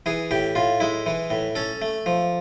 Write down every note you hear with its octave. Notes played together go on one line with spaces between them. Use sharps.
E3 G#4
A2 G4
A2 F4
G#3 E4
E3
A2
C#4 A4
A3
F3